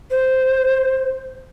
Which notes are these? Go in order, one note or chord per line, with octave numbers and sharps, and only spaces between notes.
C5